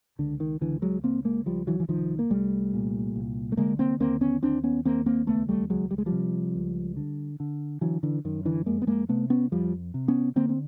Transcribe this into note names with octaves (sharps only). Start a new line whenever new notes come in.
C#2 D3
D#3
C#2 D3 E3
F#3 G#3
C#3 A#3 C4
G#3 A#3
C#2 F3 G3
E3 F#3
E3
C2 D#3 F3
A#3
C2 G3 A3
A#2
C2
A3
D3 G#3 A#3
A#3 C4
D#2 A#3 C4
B3 C#4
D#2 C4 D4
B3 C#4
D#2 A#3 C4
A#3 C4
C#2 A3 B3
G3 A3
C#2 F#3 G#3
G3
G#3
F3 G3
C3
C#2
D3
D3
D3 E3 F#3
D3 E3
F#2 D#3
D3 E3
F2 G#3 A#3
B3
G#3 A#3
C3 A3 B3
B3 C#4
F2 F3 G3
C3
B3 C#4
D3 A#3 C4
C4